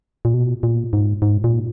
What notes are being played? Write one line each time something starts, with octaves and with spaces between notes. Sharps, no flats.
A#2
B2
A#2
G#2
G#2
A#2